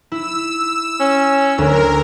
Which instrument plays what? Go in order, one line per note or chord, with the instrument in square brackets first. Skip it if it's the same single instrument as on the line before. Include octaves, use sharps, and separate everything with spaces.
[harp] E4 [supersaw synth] E6
[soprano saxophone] C#4
[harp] D2 [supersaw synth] A#4